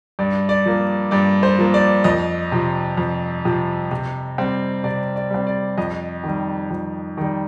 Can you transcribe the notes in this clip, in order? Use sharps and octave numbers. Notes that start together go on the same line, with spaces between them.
G2 D5
D5
F3 A#3
G2 D5
C5
F3 A#3
D5
F2 D#5
C3 F3
F2
C3 F3
C3
G3 C4
C3 D5
D5
G3 C4
D5
F2 D#5
D#3 G3
F2
D#3 G3